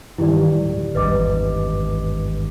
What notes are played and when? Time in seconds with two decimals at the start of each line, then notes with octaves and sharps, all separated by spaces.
0.18 G2 D#3 E3 E4 G4 D5
0.49 D1
0.95 G#1 E2 G2 B4 D#5 D6